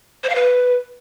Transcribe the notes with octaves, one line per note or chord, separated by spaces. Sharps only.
C5
F5
B4